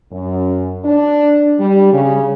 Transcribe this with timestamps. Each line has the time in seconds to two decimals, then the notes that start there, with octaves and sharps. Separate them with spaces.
0.11 F#2
0.84 D4
1.59 G3
1.93 C#3